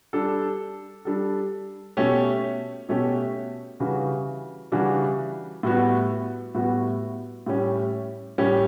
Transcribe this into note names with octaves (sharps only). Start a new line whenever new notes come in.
G3 D4 A4
G3 D4 A4
B2 A3 C#4 G4
B2 A3 C#4 G4
C#3 E3 G3 D4 F#4
C#3 E3 G3 D4 F#4
A2 G3 B3 F#4
A2 G3 B3 F#4
A2 G3 C#4 G4
A2 G3 C#4 G4